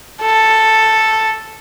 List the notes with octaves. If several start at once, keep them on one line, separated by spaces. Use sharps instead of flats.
A4